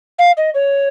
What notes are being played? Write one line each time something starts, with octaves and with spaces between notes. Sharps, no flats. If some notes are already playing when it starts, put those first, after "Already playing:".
F5
D#5
C#5